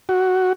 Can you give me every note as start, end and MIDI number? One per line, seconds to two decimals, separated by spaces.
0.09 0.53 66